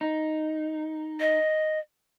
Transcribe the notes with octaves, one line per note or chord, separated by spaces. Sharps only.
D#4
D#5